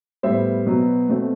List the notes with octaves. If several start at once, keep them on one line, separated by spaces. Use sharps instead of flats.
A2 G3 B3 C5 E5
B2 F#3 B3
B2 A3 C4